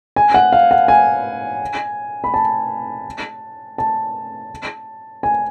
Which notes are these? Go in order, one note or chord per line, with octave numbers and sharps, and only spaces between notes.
G#5
F#5
F5
F#5
G#5
B5
A5
A5
G#5